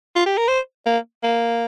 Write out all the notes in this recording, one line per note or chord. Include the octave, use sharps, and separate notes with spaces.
F4
G4
A#4
C5
A#3
A#3